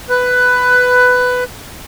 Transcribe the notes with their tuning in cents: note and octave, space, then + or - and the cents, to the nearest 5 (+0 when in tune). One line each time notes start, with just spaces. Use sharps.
B4 +10